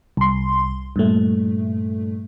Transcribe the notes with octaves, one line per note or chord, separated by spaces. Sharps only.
C2 C6
G2 A#2 A3